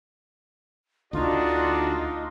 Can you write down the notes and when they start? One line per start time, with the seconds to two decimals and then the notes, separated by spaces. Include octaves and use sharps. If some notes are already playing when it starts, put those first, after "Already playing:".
1.13 D2 D3 D4 D#4 F4 F#4